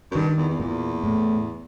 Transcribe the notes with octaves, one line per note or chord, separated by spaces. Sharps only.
F#2
G2 D#3
E2
E2
E2 A#2
A2